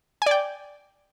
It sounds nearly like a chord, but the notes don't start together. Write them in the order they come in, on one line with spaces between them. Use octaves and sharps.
G#5 D5 G5